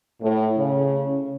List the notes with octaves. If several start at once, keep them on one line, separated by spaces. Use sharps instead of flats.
A2
C#3